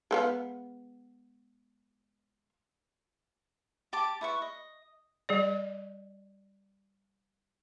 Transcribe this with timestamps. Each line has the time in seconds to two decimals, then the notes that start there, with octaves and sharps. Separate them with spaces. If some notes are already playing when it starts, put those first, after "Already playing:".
0.11 G#3 B3 F5
3.93 G4 A5 D6
4.21 E4 B4 C#6
4.42 D#5
5.29 G3 G#4 D5